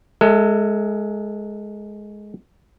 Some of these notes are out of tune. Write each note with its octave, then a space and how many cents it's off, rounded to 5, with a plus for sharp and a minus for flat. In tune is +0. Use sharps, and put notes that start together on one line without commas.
G#3 +5 A4 +35 E5 -5